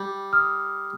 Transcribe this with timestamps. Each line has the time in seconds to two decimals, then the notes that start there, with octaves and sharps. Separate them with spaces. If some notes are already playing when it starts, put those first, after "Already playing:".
Already playing: G3
0.33 D#6 F6